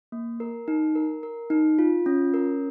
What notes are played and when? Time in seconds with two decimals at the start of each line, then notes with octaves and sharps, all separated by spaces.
0.12 A#3
0.40 A#4
0.68 D#4
0.95 A#4
1.23 A#4
1.50 D#4
1.79 F4
2.06 C#4
2.34 A#4